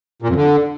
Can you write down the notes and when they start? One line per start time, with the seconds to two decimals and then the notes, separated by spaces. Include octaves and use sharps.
0.22 A#2
0.29 F2
0.36 D3